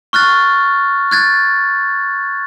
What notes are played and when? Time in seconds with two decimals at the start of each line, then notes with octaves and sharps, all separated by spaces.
0.13 C#6 F6 F#6 A6
1.11 F#6 G#6 A6